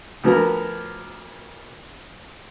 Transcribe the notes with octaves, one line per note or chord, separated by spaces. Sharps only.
D2 F3 B3 A#4